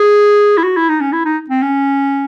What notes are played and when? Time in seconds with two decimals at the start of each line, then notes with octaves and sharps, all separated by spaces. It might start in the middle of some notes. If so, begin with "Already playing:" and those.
Already playing: G#4
0.57 E4
0.64 F#4
0.76 E4
0.89 D#4
1.01 C#4
1.13 E4
1.25 D#4
1.50 C4
1.62 C#4